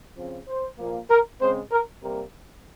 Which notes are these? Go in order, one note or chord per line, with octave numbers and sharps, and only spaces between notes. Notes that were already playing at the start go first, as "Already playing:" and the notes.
C#3 F3 C4
C5
A#2 F3 A#3
A#4
C#3 G#3 C4 C5
A#4
C3 G3 A#3 A#4